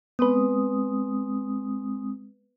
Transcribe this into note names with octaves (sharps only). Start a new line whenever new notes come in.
G#3 B3 C4 B4 D#6